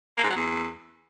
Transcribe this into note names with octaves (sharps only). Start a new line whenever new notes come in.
A#3
G#2
F#3
E2